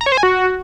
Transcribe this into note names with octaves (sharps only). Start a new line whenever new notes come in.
A#5
C#5
C5
G#5
F#4